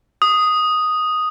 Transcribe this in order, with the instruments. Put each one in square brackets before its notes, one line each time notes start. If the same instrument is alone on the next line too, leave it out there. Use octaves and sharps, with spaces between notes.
[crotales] D#6